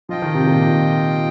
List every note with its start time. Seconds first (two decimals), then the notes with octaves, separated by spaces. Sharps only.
0.09 F3 F4 D#5 G5
0.22 D#3
0.35 C3
0.48 A#2 D#3